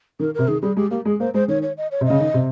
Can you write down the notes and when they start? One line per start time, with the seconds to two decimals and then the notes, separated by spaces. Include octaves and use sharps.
0.19 D#3 A#4
0.34 C3 A#4
0.48 D#3 G#4
0.62 G3 G#4
0.77 G#3 G4
0.91 A#3 G4
1.05 G#3 G#4
1.20 A#3 C5
1.34 G#3 C5
1.48 D#3 C#5
1.62 C#5
1.77 D#5
1.91 C#5
2.01 C3
2.05 C#3 D#5
2.20 D#3
2.34 C3